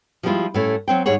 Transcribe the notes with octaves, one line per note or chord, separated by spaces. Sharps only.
F3 G3 G#3 B3 E4 F4
A2 A3 C#4
F#3 C4 G5
D#2 G#2 G3 G#4 C#5 F#5